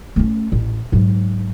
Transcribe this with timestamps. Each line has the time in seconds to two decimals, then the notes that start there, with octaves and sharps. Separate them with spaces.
0.16 A3 C#4
0.52 A1
0.92 G#2 F#3